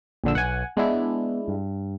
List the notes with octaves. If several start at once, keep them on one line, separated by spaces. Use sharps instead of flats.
A#1 D3 E6
B1 F#5 G#5
G#3 B3 D4 E4
G2